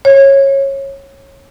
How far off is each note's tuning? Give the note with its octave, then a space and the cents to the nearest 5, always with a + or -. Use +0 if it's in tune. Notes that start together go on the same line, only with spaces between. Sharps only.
C#5 -20